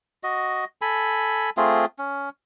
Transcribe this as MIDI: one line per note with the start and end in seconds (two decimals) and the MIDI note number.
0.23 0.65 66
0.23 0.65 75
0.82 1.50 69
0.82 1.50 80
0.82 1.50 83
1.57 1.85 57
1.57 1.85 60
1.57 1.85 65
1.57 1.85 68
1.99 2.29 61